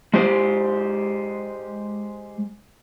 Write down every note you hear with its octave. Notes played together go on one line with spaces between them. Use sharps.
G#3 G4 C5